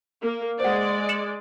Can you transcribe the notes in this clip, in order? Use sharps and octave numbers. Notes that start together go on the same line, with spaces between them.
A#3
G#3 C5 D5 F#5
C#7 E7 F#7